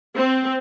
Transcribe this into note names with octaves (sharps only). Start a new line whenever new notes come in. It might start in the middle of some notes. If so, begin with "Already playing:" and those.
C4